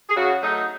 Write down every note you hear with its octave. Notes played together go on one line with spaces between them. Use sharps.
G#4
C#3 F#4
F#3 A3 D#4